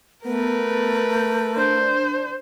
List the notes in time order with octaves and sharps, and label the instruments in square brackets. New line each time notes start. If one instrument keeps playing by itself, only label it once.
[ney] A3 [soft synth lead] B3 [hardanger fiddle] A#4 B4
[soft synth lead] D4 [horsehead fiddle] C5